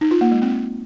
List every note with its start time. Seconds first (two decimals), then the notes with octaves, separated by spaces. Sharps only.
0.01 D#4
0.11 F4
0.21 A#3
0.31 G#3
0.42 C4